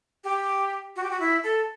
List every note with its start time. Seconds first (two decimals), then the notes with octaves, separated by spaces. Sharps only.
0.24 G4
0.96 F#4
1.03 G4
1.11 F#4
1.20 E4
1.44 A4